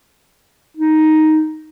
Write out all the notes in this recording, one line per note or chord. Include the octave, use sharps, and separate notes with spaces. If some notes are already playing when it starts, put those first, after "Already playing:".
D#4